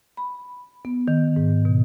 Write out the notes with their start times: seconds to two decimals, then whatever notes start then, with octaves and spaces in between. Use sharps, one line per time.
0.17 B5
0.85 B3
1.08 D#3
1.36 G#2
1.65 B2